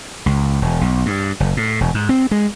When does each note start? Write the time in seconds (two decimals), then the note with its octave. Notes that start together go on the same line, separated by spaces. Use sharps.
0.26 C#2
0.62 E1
0.81 B1
1.06 G2
1.40 F#1
1.57 A2
1.81 E1
1.94 G#2
2.09 C4
2.31 G#3